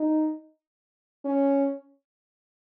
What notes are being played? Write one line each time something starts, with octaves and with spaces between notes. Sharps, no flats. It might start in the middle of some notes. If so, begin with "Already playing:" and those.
Already playing: D#4
C#4